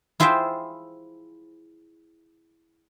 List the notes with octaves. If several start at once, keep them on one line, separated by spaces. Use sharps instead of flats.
E4 F4 G#4 C5 E5 G5